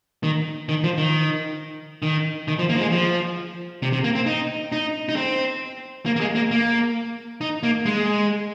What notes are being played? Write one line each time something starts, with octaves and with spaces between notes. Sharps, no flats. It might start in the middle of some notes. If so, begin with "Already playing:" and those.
D#3
D#3
F3
D#3
D#3
D#3
F3
A#3
F3
G#3
F3
C3
C3
A#3
C4
D#4
D#4
D#4
C4
A#3
A#3
G#3
A#3
A#3
D#4
A#3
G#3